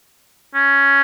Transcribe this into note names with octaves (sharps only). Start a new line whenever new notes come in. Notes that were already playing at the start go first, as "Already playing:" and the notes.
C#4